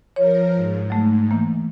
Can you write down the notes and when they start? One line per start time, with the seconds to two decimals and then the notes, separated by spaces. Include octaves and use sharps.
0.16 F3 A#4 C#5
0.55 G#2
0.90 F#3 A3
1.31 E3 A#3